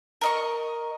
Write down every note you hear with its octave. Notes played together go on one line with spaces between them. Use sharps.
A#4 D#5 C#6